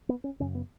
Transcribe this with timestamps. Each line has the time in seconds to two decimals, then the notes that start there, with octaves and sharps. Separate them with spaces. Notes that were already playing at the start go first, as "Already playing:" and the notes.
0.09 B3
0.24 C#4
0.40 F#2 C#3 C#4
0.55 B3